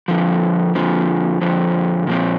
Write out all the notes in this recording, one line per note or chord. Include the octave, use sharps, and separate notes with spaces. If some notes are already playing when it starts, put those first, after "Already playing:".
F2 D3 F3
F2 D3 F3
F2 D3 F3
A#2 F3 C4